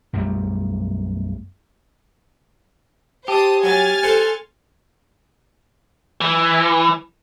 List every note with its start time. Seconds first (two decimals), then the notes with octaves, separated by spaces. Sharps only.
0.13 B1 F#2 G3 A3
3.28 G4 C5 A5 D#6
3.63 F#3 G#5 F6 A6
4.03 A4 C5 F#5
6.21 E3